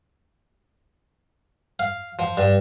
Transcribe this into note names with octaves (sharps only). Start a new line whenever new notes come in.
F5
F3
G2